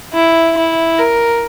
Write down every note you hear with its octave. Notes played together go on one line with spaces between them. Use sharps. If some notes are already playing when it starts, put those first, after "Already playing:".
E4
E4
A#4